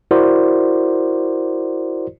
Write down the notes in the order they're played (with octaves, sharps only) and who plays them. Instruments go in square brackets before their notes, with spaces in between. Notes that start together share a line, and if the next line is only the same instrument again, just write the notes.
[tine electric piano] E4 F#4 A#4 C5 D5